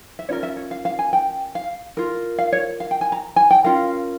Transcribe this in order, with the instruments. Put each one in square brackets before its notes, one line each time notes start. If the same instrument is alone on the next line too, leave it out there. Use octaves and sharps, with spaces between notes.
[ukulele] E5
C#4 F4 A#4 C#5
E5
C#5
F5
F5
G#5
G5
F5
F4 A#4
F5
C#5
F5
G5
G#5
A#5
G#5
G5
C#4 F4 A#4 F5